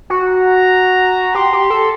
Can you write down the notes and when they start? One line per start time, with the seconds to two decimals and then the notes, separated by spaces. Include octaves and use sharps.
0.10 F#4
0.28 A#5
1.35 G4 C6
1.53 G4
1.70 A4